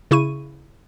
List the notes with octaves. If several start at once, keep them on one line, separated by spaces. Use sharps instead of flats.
C#3 E4 C#6 D#7